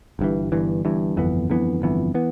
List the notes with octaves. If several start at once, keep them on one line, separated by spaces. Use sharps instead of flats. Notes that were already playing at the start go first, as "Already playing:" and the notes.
G1 G2 E3
G1 G2 E3
G1 G2 E3
G1 F2 E3 B3
G1 F2 E3 B3
G1 F2 E3 B3
E3 B3